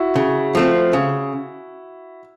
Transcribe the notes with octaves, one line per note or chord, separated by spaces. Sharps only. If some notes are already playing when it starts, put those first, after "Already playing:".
Already playing: E4 F#4
C#3
F3 A3 C4
C#3